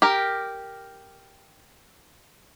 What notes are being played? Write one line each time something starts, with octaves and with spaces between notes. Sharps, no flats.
G4 A#4